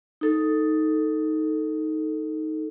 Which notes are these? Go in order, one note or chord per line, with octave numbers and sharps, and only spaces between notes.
D#4 A4